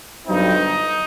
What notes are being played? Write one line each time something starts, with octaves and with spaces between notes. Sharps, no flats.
G1 G2 F#3 C4 D#4